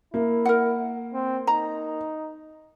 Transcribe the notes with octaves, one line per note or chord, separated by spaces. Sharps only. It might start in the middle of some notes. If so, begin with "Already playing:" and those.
A#3 E4
A#4 F#5
C4
D#4 A#5